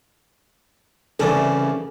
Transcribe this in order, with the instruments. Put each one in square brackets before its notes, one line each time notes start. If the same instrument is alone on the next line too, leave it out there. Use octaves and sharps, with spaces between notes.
[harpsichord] C2 E3 D5 [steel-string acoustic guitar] C#3 [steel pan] A4